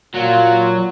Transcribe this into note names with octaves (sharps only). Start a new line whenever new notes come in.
A#2 F#3 F4